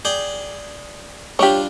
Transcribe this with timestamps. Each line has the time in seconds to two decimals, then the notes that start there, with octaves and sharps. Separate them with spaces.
0.05 G#4 D5 G5
1.39 G3 D4 F4 G4 C#5